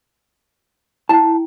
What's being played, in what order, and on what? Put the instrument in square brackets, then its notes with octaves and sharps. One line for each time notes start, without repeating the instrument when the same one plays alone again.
[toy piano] E4 G5 [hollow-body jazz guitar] A5